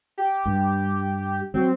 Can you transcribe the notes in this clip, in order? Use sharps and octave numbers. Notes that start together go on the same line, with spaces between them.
G4
G2
F#3 C4